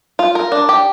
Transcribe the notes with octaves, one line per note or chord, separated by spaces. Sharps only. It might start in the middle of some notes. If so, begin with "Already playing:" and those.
F4
A#4
D4
G4